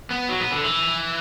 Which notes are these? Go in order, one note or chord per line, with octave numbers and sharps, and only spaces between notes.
B3
F#3
B3
D3
E3